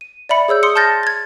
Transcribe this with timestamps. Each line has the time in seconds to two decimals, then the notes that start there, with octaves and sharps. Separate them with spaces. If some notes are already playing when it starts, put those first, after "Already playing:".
0.01 D#7
0.29 D5 E5 B5 C#7
0.48 G#4 C#5 E6 G6
0.63 C6 D#6 C#7
0.76 A5 C6 F6 G6 A6 A#6
1.03 G#6 A6